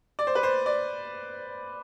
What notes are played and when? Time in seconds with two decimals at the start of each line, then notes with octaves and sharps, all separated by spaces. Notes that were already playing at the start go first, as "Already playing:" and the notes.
0.19 D5
0.27 C5
0.35 B4
0.43 C5
0.66 D5